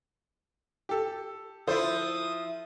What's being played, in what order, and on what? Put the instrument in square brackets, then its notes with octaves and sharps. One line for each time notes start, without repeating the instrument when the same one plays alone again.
[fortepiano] G4 A4
[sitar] F3 E4 [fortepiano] A4 C5 [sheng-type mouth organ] D#6